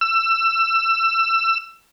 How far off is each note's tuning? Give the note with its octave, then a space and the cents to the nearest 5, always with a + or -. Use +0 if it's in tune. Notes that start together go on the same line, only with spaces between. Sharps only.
E6 +25